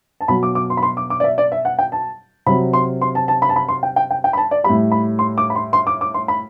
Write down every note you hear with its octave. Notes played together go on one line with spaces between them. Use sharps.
A5
B2 F#3 B5
D6
D6
C6
B5
C6
D6
D6
D5
E5
D5
E5
F#5
G5
A5
C3 F#3 B5
C6
C6
A5
A5
B5
A5
B5
C6
G5
G5
G5
G5
B5
A5
D5
G3 B5
A2
B5
C6
D6
B5
C6
C6
D6
D6
C6
B5